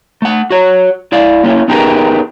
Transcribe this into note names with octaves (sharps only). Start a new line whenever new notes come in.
A3 F#5
F#4 C#5
E4 D5 F5
A#3 C#4 D#4 E4
B3 D#4 G4 G#4 A#4 B4